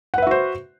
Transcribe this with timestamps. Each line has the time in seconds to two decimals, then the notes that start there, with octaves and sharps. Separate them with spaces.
0.14 F#5
0.18 B4
0.22 E5
0.27 F#4
0.31 C5